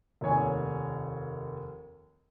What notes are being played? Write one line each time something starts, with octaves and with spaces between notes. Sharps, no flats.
F1 D#2 C#5 G#5